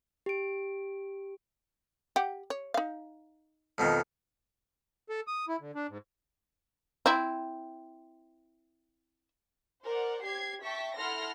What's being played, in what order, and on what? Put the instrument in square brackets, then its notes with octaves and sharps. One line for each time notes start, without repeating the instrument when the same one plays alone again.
[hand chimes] G4 D7
[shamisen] G4 F#5
C#5
D#4 F5
[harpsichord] F2 B2 D#3
[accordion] A4
D#6
E4
D3
D4
G#2
[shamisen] C4 E4
[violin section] A#4 C5 D5 F#5
G4 G#6 C7
E5 G5 A5 C#6 B6
E4 A4 F#5 C6 F6 A#6